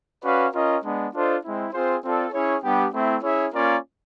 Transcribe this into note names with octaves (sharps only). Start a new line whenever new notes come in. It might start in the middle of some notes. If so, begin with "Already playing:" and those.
C#4 F#4 B4 D5 F5
C#4 F4 A#4 D#5
G#3 B3 D4
D4 F4 A4 C5 D#5
G#3 C4 E4
C4 F4 G#4 C5
C4 F4 A4 D5
C#4 E4 G#4 C#5
G3 B3 D4 G4
A3 C4 E4
C#4 E4 G#4 C#5 E5
A#3 C#4 F4 A#4 D5